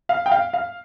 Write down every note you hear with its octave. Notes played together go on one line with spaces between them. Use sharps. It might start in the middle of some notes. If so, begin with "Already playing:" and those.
F5
G5
F5
F5